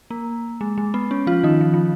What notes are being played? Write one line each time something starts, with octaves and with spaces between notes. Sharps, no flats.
A#3
G#3
G#3
B3
C#4
F3 F4
D#3 D#4
F3
F3